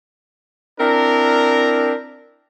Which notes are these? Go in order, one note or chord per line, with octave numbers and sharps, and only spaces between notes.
C4 D4 E4 A#4